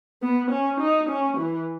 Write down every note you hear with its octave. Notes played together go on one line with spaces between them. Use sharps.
B3
C#4
D#4
C#4
E3